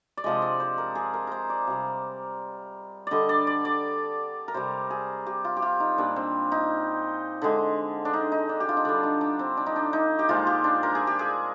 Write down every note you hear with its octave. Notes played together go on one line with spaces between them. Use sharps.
D5
C3 F3 G#3 D#5
D5
C5
A#4
G#4
A#4
A#4 C5
D5
C3 G3
D3 G3 D5 D#5
D5
D5
D5
A#4
C3 G3 C5
G#4
G4
F4
G4
F4
D#4
A#2 G3 D4
C4
D#4
D3 G#3
D4
D#4
D#4
D4
G4
F4
D#4
D3 G3 D4
D#4
D4
C4
D4
D#4
D4
D#4
G4
A#2 F3 G#3 F4
G4
D4
A#4
G#4
G4
G#4